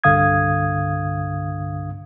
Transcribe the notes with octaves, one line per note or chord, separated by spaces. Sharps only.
C2 G2 D3 F5 D#6 G#6